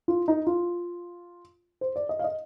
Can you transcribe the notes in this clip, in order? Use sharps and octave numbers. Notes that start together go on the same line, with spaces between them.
F4
D#4
F4
C5
D5
D#5
F5
D#5